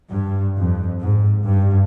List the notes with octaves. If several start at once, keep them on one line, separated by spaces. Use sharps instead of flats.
G2
F2
G#2
G2